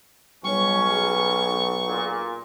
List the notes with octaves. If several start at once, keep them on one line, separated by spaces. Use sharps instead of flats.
B1 B2 G3 C#4 C#5 C#6
G#4
A#2